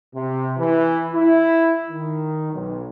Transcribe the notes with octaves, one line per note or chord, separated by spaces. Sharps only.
C3
E3
E4
D#3
B1